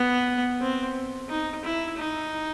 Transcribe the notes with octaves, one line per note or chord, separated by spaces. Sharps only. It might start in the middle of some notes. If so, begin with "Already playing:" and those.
Already playing: B3
C4
D#4
E4
D#4